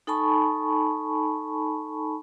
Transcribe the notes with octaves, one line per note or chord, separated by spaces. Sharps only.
D#4 A4 G#5 A5 B5 C#6